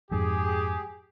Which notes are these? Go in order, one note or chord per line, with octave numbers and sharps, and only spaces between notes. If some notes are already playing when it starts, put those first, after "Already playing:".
F2 G#2 G4 G#4